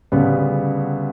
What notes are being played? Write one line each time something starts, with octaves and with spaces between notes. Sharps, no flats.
D2 C#3 G3 B3 C#4